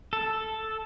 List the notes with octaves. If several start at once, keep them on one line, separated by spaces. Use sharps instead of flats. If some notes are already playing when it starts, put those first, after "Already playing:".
A4